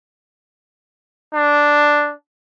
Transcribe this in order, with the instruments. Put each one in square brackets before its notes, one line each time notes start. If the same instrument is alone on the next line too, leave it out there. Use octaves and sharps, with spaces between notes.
[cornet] D4